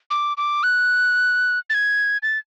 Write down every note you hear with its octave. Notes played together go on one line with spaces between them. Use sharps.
D6
D6
F#6
A6
G#6
A6